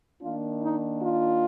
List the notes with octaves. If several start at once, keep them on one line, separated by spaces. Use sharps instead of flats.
D#3 A#3 D4 F4
D#4
F4